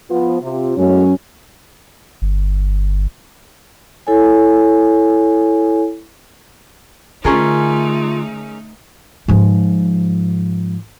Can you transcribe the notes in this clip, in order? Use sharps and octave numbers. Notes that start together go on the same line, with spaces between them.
F3 B3 F4
C3 F4
F#2 A2 F#3 G#3 C#4
G1
E4 A4 C#5 G#5
D3 A3 C#4 D#4 F4 G#4 A#4
G#2 F3